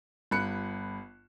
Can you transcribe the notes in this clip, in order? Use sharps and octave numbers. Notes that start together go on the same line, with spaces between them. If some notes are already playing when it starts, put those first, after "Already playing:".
G1 B5 F#6 C#7